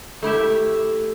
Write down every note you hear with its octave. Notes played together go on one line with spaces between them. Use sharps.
A3 E4 G4 E5